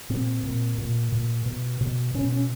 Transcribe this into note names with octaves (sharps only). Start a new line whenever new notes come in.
A#2 C4
A#2
A#2
A#2
B2
B2
B2 C#4
C#4